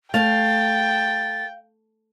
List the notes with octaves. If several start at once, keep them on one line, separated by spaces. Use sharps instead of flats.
A3 F5 G5 A6